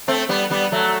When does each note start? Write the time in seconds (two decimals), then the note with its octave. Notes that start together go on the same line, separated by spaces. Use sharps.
0.08 A3 C4
0.29 G3 B3
0.50 G3 B3
0.72 F#3 A3